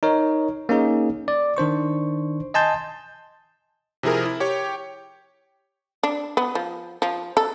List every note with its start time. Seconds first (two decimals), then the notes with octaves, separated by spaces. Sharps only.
0.03 D#4 A#4 C#5
0.69 A#3 C#4 D#4 G#4
1.28 D5
1.57 D#3 D4 C5 C#6
2.54 D#5 G#5 A5 C6 G6
4.03 C3 F3 E4 G#4 A#4
4.25 E4
4.40 G4 C#5 G5
6.03 D4
6.37 B3
6.55 F3
7.02 F3
7.37 A4